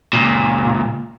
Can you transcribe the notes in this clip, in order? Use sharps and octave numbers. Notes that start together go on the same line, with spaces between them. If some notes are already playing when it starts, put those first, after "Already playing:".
C#2 A#2